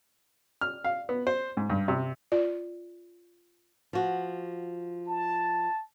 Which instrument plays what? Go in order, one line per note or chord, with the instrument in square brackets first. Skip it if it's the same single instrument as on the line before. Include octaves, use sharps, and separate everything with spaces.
[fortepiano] F6
F5
B3
C5
G#2
G2
C3
[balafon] F4 D5
[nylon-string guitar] F3 F#4
[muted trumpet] A5